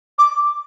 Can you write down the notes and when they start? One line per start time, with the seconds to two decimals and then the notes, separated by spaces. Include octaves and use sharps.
0.19 D6